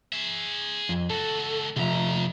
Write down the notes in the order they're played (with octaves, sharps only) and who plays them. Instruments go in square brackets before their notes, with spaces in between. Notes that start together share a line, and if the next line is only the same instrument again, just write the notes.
[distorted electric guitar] G#4 E5
[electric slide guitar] F2
[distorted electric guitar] C#2 F#4 [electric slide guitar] A4
[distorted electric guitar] D#2 A#5 [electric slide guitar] C3 F3 E5